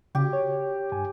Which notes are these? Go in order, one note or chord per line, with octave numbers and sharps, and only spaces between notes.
C#3 G4
C#5
G2 G#5